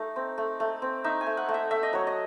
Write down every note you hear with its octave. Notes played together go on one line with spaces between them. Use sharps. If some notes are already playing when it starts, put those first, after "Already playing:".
Already playing: A3 D#4
C4
A3
A3
C4
D#4 E5
G#5
A3
F#5
A3
E5
A3 E5
D#5
F#3 C#5
D#5